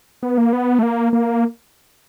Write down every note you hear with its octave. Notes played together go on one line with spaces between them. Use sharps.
B3
A#3
B3
A3
A#3
A#3